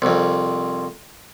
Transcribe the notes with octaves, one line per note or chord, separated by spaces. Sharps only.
C2 F2